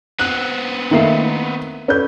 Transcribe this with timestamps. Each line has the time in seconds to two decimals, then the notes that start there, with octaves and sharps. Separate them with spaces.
0.19 B3 C4 F#6
0.91 D#3 A3 A#3 E4 E5 C7
1.88 C#4 A4 B4 D5 G6